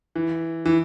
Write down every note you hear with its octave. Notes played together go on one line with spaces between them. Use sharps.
E3
E3